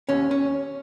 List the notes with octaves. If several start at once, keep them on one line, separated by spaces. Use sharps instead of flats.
D#2 C#4
C#4